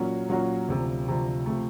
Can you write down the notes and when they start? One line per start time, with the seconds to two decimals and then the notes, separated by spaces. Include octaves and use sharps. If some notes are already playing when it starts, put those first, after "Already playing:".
Already playing: A#2 F#3 A#3 C#4 F#4
0.28 A#2 F#3 A#3 C#4 F#4
0.68 D2 C3 F3
1.08 D2 C3 F3
1.46 C3 F3 A3